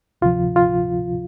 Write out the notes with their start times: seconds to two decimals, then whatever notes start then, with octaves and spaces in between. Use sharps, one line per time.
0.21 D2 C3 F3 F4
0.56 F4